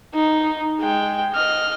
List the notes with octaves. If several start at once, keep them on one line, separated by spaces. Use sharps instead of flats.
D#4
G#3 G5
D#5 F6